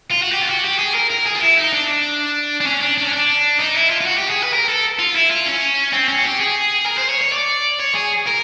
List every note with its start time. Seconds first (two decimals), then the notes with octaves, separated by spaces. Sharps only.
0.11 F4
0.22 F#4
0.32 G4
0.41 F4
0.48 F#4
0.64 G4
0.79 G#4
0.94 A#4
1.10 A#4
1.26 G#4
1.35 F4
1.41 E4
1.57 D#4
1.73 D4
2.61 D4
2.66 C#4
2.82 D4
2.98 D4
3.06 C#4
3.13 D4
3.60 D#4
3.75 E4
3.90 F4
4.01 F4
4.06 F#4
4.17 G4
4.30 G#4
4.43 B4
4.53 A#4
4.68 A4
4.99 F4
5.15 E4
5.30 F4
5.46 C#4
5.93 C4
6.08 C#4
6.19 F#4
6.24 G4
6.40 G#4
6.86 A#4
6.98 C5
7.09 C#5
7.21 C#5
7.32 D5
7.80 C#5
7.94 G#4
8.26 A#4